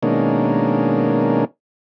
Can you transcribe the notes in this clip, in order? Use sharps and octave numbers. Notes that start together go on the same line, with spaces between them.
B2 D#3 G#3 A#3 C#4 D4